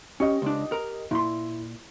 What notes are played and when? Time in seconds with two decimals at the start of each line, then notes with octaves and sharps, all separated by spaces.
0.20 C#4 G4 D#5
0.42 C#2 D4
0.72 A#4
1.11 A#2 E4 C6